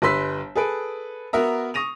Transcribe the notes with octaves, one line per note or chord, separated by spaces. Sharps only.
G1 G3 B4 C6 E6 B6
G#4 A4 B4 D7
B3 F#4 A#4 E5 A#5
C#6 D#6 A#6 D#7 F7